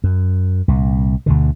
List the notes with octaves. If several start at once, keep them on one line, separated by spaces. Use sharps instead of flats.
F#2
C2 A#2
D2 B2 D3